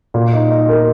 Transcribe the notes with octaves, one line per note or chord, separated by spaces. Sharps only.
A#2
D#4
D#4
A#4